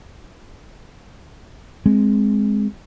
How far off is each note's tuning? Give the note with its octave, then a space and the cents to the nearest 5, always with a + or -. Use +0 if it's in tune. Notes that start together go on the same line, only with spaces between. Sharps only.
G#3 +0 C4 +0